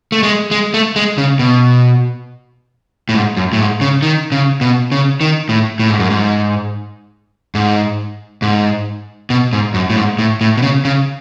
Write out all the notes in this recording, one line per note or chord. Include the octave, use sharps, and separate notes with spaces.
A3
G#3
G#3
A3
G#3
C#3
B2
A2
G#2
F#2
A2
G#2
C#3
D#3
C#3
B2
C#3
D#3
A2
A2
G#2
F#2
G#2
G#2
G#2
B2
G#2
F#2
A2
G#2
A2
A2
B2
C#3
C#3